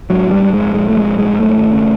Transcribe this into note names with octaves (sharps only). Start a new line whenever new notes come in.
G#2 F#3
G#2 G3
G#2
G#3
A#1
A#1 G#3
A#1 A3
G#3
A#1
G#3
G#2
F#2 A3
G#1
C#3